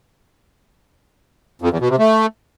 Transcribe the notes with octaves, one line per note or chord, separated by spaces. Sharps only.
F2
E2
B2
C3
A3